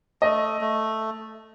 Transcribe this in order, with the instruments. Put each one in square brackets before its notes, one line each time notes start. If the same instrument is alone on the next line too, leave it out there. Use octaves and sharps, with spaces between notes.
[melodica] A3 [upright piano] D#5
[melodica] A3